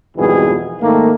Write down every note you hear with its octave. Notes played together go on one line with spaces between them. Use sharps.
G#1 F2 B2 E3 G3 G#4
G#2 D#3 A3 A#3